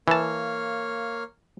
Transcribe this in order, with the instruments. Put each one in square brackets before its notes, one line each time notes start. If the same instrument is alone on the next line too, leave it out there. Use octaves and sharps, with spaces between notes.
[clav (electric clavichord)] E3 A5 [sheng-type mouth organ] A#3 C#5 F5